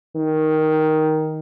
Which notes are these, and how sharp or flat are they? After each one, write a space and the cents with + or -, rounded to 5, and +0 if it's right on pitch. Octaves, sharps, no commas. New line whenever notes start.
D#3 +5